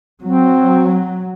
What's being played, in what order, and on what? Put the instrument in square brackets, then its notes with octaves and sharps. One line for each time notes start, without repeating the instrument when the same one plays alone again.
[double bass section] F#3 [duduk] C4